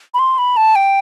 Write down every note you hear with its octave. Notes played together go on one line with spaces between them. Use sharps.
B5
C6
B5
A5
G5